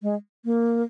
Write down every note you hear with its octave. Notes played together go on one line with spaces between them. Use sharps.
G#3
A#3